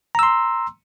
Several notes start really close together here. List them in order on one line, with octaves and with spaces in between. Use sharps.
A#5 E6 C6